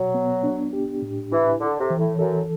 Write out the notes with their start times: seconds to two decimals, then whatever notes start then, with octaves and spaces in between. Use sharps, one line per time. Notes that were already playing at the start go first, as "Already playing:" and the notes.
Already playing: B2 F#3
0.14 B3
0.43 D4
0.73 G4
1.02 A2
1.32 E3 E4
1.61 D3 A4
1.80 C3
1.90 E3
1.99 A2
2.19 F#2 A4